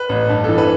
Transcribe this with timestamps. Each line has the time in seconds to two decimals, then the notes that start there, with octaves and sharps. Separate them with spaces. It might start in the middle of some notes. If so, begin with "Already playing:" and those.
Already playing: B4
0.09 A1
0.29 G2
0.44 E3 A4
0.58 B4